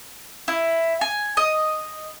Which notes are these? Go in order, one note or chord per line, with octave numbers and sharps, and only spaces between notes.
E4
G#5
D#5